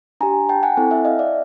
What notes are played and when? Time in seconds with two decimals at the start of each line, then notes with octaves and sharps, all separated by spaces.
0.21 D4 G4 G#5 A#5
0.49 G5 A5
0.63 F#5 G#5
0.77 C4 E4 A4
0.91 E5 F#5
1.05 D#5 F5
1.19 D5 E5